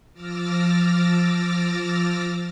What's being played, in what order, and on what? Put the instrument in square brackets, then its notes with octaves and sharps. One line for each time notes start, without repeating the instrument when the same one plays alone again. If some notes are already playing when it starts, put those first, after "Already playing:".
[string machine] F3 D6 E6 F6 A6 A#6